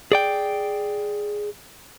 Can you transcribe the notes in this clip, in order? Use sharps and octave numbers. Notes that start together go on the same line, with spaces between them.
G#4 D5 G5